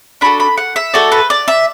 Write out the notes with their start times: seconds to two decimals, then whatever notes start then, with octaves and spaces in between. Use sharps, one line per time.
0.21 D4 F#4 A4 B5
0.40 B5
0.57 F#5
0.76 E5
0.94 A3 F#4 A4 D5
1.12 B4
1.30 D5
1.48 E5